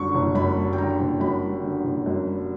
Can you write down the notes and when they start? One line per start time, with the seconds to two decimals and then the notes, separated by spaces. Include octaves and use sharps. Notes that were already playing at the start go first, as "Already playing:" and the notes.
Already playing: F#1 F#2 D3 G3 C#6
0.15 F#1
0.35 F#2 B5
0.56 G3
0.73 G5
0.78 D3 A#5
0.99 F#1
1.20 F#2 B5
1.41 G3
1.63 D3
1.84 F#1
2.06 F#2
2.27 G3